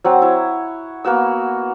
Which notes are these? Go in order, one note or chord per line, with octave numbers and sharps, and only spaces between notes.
F#3 C4 F#5
E4 C#5
A#3 B3 F#4 E6